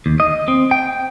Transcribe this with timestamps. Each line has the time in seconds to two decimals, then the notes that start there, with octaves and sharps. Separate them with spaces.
0.06 D#2
0.20 D#5
0.48 C4
0.71 G5